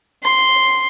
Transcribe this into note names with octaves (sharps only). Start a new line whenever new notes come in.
C6